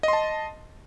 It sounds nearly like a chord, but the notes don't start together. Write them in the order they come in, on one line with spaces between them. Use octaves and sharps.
D#5 C6 A5